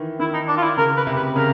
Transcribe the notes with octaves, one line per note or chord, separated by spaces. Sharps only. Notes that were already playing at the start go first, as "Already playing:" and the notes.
Already playing: D#3 E3
D#3 E4
D#4
D4
F4
E4
C#3 A#4
B4
C3
B4
C#3 A#4